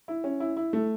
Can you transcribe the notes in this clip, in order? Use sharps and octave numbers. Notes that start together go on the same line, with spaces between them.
E4
C#4
E4
E4
A3